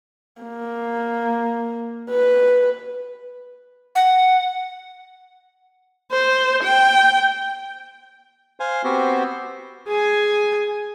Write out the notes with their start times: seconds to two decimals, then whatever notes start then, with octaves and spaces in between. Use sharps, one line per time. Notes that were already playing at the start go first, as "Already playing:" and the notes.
0.42 A#3
2.10 B4
3.95 F#5
6.11 C5
6.63 G5
8.60 C5 F5 G#5
8.84 B3 C4 F#4 G4 C5
9.88 G#4 G#5